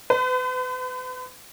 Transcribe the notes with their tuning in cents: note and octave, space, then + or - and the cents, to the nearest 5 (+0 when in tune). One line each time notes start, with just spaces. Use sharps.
B4 +35